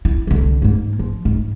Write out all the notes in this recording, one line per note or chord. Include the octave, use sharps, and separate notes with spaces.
E4
C2 D3
G#2 A#3
F3
G#2